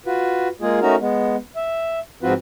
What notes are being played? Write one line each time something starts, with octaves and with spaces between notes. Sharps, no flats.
F4 F#4 B4
G#3 A#3 F4 G#4
A3 C#4 D#4 F#4 A#4
G#3 B3
E5
G#2 F3 C4 F4 F#4 B4